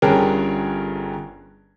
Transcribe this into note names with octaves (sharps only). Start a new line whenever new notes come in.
G1 G2 C#4 G#4 A#4 G5